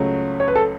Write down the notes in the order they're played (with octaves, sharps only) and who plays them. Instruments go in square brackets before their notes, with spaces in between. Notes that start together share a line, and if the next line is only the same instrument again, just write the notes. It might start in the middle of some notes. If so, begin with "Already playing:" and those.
Already playing: [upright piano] C#2 C#3 F#3 A3
[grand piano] C#5
B4
A4